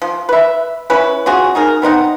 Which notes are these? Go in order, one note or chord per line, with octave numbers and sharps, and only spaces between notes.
F3
B4 E5
C#4 E4 B4
C#4 F4 F#4 G#4
D#4 G#4 A#4
B3 C4 D#4 F#5